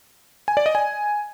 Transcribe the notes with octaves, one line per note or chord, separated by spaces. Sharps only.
G#5
D5
D#5
G#5